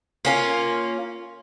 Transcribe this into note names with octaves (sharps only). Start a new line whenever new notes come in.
A#3 C#4 F4